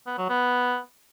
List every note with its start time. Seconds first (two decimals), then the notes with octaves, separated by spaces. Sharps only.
0.06 B3
0.18 F#3
0.29 B3